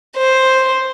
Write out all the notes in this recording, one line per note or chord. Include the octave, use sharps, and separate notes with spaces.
C5